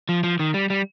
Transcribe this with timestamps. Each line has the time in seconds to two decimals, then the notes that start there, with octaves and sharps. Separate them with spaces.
0.09 F3
0.24 F3
0.40 D#3
0.54 G3
0.70 G3